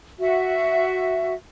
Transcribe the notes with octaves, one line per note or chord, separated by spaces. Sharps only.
F#4 E5